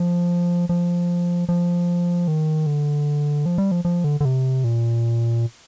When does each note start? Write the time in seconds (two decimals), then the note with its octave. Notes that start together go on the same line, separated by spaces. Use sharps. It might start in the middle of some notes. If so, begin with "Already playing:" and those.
Already playing: F3
0.69 F3
1.49 F3
2.28 D#3
2.66 D3
3.46 F3
3.58 G3
3.72 F3
3.85 F3
4.04 D3
4.21 D3
4.25 C3
4.64 A#2